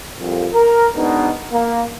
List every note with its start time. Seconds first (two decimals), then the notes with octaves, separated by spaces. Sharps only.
0.19 C2 F2
0.52 A#4
0.95 G#2 B2 B3 D4 D#4
1.52 A#3